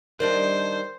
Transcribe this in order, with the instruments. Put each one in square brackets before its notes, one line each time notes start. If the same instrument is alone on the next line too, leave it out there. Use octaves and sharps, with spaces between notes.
[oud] D#3 G3 D4 [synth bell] A#4 D5 [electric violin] C5